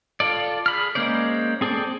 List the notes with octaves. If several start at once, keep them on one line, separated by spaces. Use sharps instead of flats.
F4 A4 D5
G#4 B5 F6
G#3 A#3 C#4 C5 D5
C4 G#4 A4 C5 D5